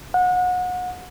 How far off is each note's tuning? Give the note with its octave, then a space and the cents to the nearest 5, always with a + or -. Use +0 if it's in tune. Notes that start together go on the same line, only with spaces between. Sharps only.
F#5 -30